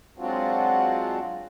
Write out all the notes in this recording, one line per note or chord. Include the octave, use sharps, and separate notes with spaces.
F#3 G#3 C4 D4 F4 F#4